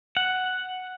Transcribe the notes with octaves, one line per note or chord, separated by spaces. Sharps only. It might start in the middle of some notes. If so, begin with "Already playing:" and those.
F#5